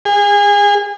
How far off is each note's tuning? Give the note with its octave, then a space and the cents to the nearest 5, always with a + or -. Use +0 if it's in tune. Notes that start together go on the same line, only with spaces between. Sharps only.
G#4 -30